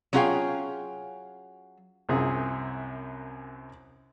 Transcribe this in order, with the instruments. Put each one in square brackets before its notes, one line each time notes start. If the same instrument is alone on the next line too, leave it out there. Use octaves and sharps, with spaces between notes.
[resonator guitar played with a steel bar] F#3 C#4 F4 G#4 F5 G5
[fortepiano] C2 F#2 C3 F4 G#4